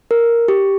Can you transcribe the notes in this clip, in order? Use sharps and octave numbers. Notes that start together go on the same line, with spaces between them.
A#4
G4